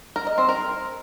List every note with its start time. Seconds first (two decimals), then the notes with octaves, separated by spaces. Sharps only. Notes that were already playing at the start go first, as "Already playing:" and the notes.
0.16 A#4
0.27 D#5
0.38 C4
0.49 A#4